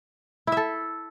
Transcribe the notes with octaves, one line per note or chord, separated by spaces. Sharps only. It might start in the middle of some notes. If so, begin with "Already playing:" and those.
E4 A4 E5